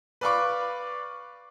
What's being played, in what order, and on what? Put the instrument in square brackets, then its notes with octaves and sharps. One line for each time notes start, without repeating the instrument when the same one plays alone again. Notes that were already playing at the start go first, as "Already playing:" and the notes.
[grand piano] B4 D5 F5 B5 C#6 D6